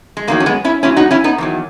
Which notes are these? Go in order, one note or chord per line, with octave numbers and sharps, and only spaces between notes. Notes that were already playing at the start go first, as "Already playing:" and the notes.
G#3
E2 D#3 F#3 A#3
C#4
G#3 B3
C#4 E4
A#2 F#3 C#4 E4
D#4 F#4
C#4 E4
B3 D#4
E2 D#3 F#3